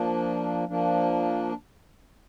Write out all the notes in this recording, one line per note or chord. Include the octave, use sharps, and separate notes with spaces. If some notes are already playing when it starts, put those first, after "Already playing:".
Already playing: F3 A#3 D4
F3 A#3 D4